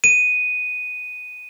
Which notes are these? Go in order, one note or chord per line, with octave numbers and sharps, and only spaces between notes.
D#7